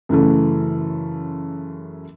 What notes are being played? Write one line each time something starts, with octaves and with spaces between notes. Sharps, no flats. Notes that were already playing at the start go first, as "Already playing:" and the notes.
F#2 C#3 E3 A3